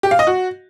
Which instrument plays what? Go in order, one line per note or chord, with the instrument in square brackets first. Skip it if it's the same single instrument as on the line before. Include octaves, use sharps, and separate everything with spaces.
[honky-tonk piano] G4
F5
D#5
F#4